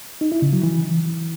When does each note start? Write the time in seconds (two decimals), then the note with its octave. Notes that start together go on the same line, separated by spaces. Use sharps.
0.21 D#4
0.32 E4
0.42 C#3
0.53 F#3
0.63 E3